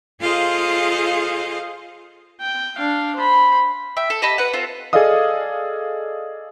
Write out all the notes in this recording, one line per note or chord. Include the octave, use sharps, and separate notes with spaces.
F4 G#4 A4 C5 D#5 F5
G5
D4 F5
C5 B5
E5 G5
A4
G4 D#5 A5 B5
B4 F#5
C4 F4 A4
G#4 A4 D5 D#5 F5 D#6